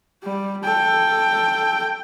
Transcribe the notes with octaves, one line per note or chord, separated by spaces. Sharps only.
G3
A4 G5